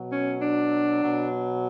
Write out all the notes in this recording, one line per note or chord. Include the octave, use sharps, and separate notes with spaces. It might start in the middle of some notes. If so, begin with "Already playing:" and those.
Already playing: B2 F#3
C#4
D4
B2 F#3